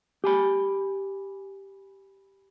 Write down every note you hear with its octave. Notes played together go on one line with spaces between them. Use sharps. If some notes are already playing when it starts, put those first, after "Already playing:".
G4 G#5 B5